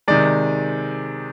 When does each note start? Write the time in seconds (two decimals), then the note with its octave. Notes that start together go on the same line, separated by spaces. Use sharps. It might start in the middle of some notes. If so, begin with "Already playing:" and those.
0.08 C3 D#3 G#3 D5